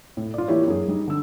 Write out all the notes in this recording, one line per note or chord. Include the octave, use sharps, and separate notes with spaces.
A2
F4 D5
E3 A#3 E4 G4 C#5
F#2 G#4
G3 D#4
D3 E6